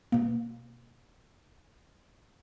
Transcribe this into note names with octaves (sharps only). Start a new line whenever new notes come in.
B2 A#3